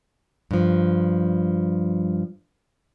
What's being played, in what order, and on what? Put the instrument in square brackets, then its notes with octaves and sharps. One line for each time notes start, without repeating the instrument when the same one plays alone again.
[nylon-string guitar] G2 F3